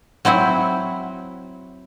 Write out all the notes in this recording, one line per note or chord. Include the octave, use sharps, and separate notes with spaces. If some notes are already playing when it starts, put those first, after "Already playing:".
F#3 C4 E4 F#4